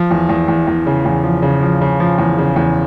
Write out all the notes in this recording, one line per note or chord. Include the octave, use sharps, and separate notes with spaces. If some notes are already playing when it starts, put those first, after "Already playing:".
Already playing: F3
E2
E2
E2
E2
C#3
E2
F3
C#3
F3
C#3
F3
E2
C#3
E2